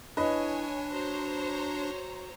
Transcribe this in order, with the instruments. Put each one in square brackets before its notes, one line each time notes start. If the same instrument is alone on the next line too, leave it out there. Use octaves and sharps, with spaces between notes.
[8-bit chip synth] D4 [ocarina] E4 [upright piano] B4 D#5 [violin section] C#5 G#5
[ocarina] F#4 [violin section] C5 C#5 A#5